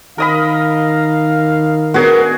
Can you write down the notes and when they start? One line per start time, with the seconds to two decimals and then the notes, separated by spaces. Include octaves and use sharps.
0.18 D#3 A#4 D#5 F5 B5
1.94 B3 D4 F#4 G#4 A#4